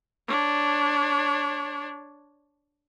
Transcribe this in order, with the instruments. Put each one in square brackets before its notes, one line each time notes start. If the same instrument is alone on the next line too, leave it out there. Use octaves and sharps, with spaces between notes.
[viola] D4 C#5